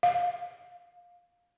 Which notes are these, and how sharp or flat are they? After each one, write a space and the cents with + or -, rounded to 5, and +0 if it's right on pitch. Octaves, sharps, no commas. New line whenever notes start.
F5 +15